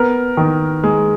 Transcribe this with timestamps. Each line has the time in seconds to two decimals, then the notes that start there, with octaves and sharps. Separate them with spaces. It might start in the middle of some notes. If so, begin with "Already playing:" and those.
Already playing: B3 A#4
0.37 D#3
0.84 G#3